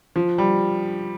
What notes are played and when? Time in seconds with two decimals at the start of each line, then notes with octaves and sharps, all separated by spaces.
0.16 F3
0.38 G3